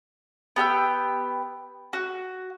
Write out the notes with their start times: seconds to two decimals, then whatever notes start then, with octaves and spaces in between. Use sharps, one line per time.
0.56 B3 G4 G5 E6
1.93 F#4